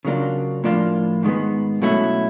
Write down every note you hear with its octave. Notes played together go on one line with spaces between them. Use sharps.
C#3 F#3 A#3 D4 F4
A2 F3 A#3 D4 F4
G#2 D#3 G#3 B3
B2 F#3 A3 C#4 E4